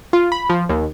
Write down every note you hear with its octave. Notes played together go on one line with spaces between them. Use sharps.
F4
B5
F3
D#2